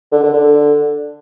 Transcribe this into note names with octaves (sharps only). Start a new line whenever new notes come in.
D3
D3
D3